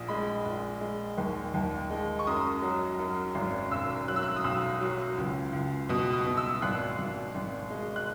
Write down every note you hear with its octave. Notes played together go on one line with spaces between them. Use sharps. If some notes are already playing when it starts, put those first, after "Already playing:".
Already playing: A#1 D#6
G#3 B5
A#1
G#3
D#2
D#2
G#3
C#6
F#2 D#6
F#3
F#2
G#1
B1 E6
F#3 F#6
E6
F#6
D#6
B1 E6
F#3
C#2
C#2
B2 D#6
D#6
B2
E6
G#1 F#6
G#1
G#1
G#3
F#6